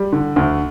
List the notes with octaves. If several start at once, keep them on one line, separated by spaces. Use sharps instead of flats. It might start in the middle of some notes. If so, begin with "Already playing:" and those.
Already playing: G3
D3
D2